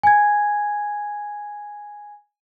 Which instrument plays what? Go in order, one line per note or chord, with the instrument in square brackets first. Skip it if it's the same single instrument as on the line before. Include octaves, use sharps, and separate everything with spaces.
[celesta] G#5 G#6